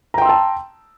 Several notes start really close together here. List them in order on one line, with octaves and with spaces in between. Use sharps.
A#5 G5 C6 E6 A5